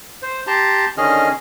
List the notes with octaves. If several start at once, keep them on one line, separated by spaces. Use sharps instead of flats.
C5
G4 A5 A#5 C6
D3 D#3 C#4 G#4 D#5 F6